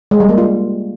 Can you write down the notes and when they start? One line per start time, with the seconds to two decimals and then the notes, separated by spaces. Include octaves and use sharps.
0.11 G#3
0.20 G3
0.29 A#3
0.38 F4